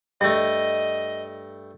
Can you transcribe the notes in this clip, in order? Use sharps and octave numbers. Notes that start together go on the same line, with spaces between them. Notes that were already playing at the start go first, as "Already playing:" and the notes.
G2 A3 D#5